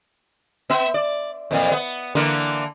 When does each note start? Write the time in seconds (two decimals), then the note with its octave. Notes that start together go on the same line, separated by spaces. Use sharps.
0.70 B3 E5
0.94 D5
1.51 F2 A#2 E3
1.72 B3
2.15 D3 E3 A#3